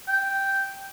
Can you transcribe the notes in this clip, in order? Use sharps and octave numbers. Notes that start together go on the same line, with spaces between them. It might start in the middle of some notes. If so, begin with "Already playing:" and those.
G5